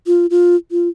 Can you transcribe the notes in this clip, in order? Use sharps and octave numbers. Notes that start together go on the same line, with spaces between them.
F4
F4
F4